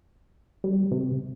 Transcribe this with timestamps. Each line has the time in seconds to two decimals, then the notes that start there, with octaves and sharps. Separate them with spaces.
0.64 G3
0.92 C3